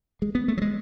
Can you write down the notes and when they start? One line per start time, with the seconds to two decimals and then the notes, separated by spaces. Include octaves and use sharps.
0.22 G#3
0.35 B3
0.48 A3
0.57 F#3
0.62 G#3